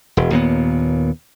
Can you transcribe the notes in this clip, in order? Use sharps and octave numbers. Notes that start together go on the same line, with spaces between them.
E1
D#2 A#2 B3